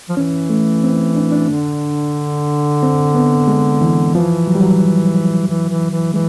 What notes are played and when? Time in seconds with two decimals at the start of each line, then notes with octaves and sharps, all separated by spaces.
0.09 F3
0.17 E3 C#4
0.50 A3
0.84 C4
1.16 D4
1.32 D4
1.49 D3
2.83 C4
3.15 B3
3.48 G#3
3.81 E3
4.15 E3 F3
4.47 F#3
4.55 G3
4.62 F#3
5.47 E3
5.69 E3
5.91 E3
6.14 E3 G#3